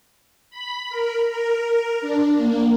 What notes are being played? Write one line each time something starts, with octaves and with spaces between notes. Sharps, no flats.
B5
A#4
A#4
D4
A#3